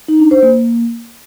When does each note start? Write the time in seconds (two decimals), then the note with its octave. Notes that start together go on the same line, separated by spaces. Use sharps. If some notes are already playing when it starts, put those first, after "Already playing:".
0.08 D#4
0.20 D4
0.31 C5
0.43 A#3